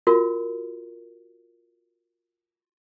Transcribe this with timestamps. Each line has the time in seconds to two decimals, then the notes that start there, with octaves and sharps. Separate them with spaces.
0.07 F4 F#4 A#4